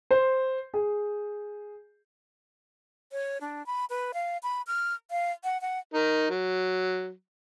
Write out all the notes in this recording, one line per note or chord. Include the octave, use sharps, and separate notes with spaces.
C5
G#4
C#5
D4
B5
B4
F5
B5
F6
F5
F#5
F#5
D#4 A#4
F#3